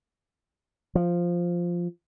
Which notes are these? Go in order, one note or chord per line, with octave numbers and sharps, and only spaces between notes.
F3